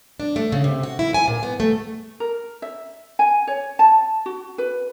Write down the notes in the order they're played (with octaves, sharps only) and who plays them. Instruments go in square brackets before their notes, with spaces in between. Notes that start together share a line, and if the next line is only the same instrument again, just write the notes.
[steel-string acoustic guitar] D4
A3
C#3
C3
F#4
E4
G#5
A#2
B3
A3
[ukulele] A#4
E5
G#5
C#5
A5
F#4
B4